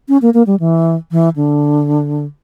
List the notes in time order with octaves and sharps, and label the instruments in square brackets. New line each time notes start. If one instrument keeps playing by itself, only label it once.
[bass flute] C#4
A#3
A#3
G3
E3
E3
D3